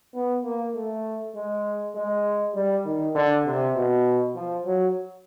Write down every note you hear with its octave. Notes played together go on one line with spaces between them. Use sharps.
B3
A#3
A3
G#3
G#3
G3
D#3
D3
C3
B2
F3
F#3